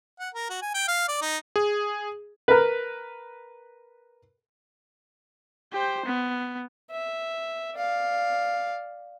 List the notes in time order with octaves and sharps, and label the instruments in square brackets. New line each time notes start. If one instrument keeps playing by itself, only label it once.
[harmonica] F#5
A#4
F#4
G#5
G5
F5
D5
D#4
[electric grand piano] G#4
[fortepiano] A#4 B4
[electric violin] G4 C5
B3
[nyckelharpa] E5
D5 F5